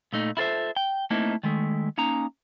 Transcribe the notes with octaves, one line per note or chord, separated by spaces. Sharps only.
A#2 A3 D#4
E4 F4 A4 A#4 C5 E5
G5
A3 A#3 C4 D#4 E4 A#4
D#3 G#3 A3
A#3 C#4 D#4 A#5